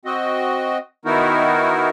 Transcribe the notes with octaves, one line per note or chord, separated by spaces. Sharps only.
C4 F#4 D#5
D#3 B3 D#4 E4 F#4 A#4